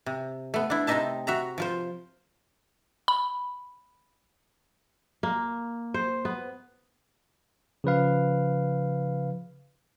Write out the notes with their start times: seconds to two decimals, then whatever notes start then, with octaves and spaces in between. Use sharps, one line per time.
0.06 C3
0.54 A3 B3
0.70 D4 E4
0.87 C3 C4 D#4 D#5 E5 A5
1.27 F#4 E5 A#5
1.58 F3 F4 C5
3.08 B5
5.23 A#3
5.94 C5
6.25 B3
7.84 C#3 F3 B4 F5